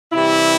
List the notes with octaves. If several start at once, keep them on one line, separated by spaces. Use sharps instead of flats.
C3 E3 G3 E4